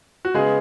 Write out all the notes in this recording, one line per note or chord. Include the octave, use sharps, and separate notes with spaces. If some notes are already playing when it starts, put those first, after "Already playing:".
F#4
C#3 G#3 B3 G#4